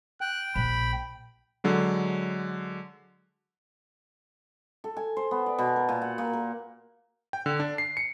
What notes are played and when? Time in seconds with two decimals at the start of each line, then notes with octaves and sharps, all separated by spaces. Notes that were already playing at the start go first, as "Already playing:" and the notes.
0.21 G5 F#6
0.56 A#1 B5
1.64 D3 F#3 G#3
4.84 A4
4.97 G#5
5.17 C5
5.31 B3
5.46 D5
5.58 B2
5.76 A#4
5.89 A#2
6.02 F#5
6.18 A#2
6.33 A#4
7.33 G5
7.46 D3
7.59 D4
7.78 C7
7.97 C#7